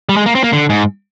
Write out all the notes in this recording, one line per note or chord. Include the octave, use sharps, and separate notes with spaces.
G3
G#3
A#3
C4
A#3
D3
G#2